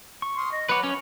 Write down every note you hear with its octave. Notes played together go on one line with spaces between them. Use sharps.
C#6
C6 D#6 F6
D#5
F#3 B4 C#5 F#5 D6
C#4 C#6